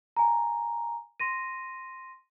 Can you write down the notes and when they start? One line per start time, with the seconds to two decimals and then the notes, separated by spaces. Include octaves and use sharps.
0.16 G#5 A#5
1.20 C6 A#6 D#7